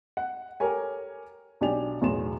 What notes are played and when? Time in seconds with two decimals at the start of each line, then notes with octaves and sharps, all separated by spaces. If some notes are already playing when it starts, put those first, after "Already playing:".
0.17 F#5
0.60 G4 A4 A#4 C#5 G#5
1.61 B1 D4 G4 D5 G#5 F7
2.01 B1 E2 A2 G#4 C6 E7